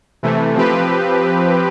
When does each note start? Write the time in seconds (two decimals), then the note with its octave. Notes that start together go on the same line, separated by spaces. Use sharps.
0.23 C3 E3 A3
0.55 F3 C4 G4 B4